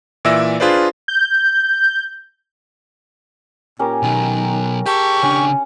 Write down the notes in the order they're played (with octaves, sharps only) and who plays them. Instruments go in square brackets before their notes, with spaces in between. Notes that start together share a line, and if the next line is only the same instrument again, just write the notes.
[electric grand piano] A#2 E3 D5 E5 E6 A#6
D4 F4 G#4 B4 C5 D5
[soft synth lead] G6
[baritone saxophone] A#2 [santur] C#4 G4 A#4
[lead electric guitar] B2 F#3 [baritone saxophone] D#3
[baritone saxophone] G4 [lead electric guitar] G#4 A5 [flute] C#6
[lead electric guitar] C#3 D4 [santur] C#4